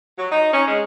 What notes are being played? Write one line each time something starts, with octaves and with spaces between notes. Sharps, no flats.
F#3
D#4
C#4
G#3